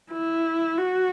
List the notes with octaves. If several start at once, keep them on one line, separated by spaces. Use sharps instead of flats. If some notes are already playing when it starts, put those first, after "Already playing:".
E4
F#4